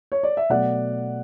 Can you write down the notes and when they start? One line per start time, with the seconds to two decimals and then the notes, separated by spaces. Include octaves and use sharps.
0.12 C#5
0.23 D5
0.37 E5
0.49 B2 F#3 A3 D5 F#5